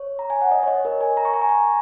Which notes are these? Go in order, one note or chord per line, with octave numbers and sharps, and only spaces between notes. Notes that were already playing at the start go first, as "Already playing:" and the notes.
Already playing: C#5
A#5
G#5
F#5
D#5
C#5
D#5
A#4
G#5
A#5
C#6
A#5
G#5
A#5